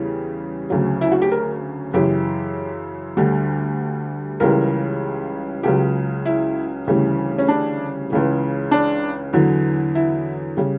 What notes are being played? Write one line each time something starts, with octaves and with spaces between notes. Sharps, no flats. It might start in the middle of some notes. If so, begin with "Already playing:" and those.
Already playing: E2 C#3 G3
D2 C#3 F#3
E4
F#4
G4
A#4
F#2 C#3 E3 G4
D2 D3 G3
C#2 C#3 E3 G3 A#4
C#2 C#3 F#3 G4
E4
D2 C#3 E3 G3
C#4
D4
C#2 C#3 E3
D4
E2 D3 F#3
E4
C#3 G3